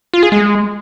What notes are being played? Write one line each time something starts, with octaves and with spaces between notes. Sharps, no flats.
F4
G#4
G#3